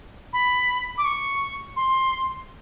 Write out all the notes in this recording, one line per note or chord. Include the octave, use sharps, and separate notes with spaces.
B5
D6
C#6
C6